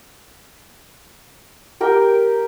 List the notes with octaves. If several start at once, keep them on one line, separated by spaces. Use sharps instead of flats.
G4 A#4 G5